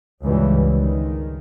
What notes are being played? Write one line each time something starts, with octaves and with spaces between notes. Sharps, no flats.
C#2 G2 E3 G3
D#3